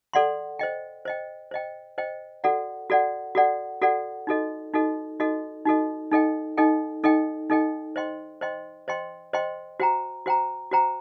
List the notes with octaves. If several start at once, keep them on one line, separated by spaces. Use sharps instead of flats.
A4 D5 F#5 C6
C5 D#5 G5
C5 D#5 G5
C5 D#5 G5
C5 D#5 G5
F#4 A4 D5 F#5
F#4 A4 D5 F#5
F#4 A4 D5 F#5
F#4 A4 D5 F#5
D#4 F#4 A4 D#5
D#4 F#4 A4 D#5
D#4 F#4 A4 D#5
D#4 F#4 A4 D#5
D#4 A4 D#5 G5
D#4 A4 D#5 G5
D#4 A4 D#5 G5
D#4 A4 D#5 G5
C5 D#5 G5 C6
C5 D#5 G5 C6
C5 D#5 G5 C6
C5 D#5 G5 C6
F#4 C5 G5 A#5
F#4 C5 G5 A#5
F#4 C5 G5 A#5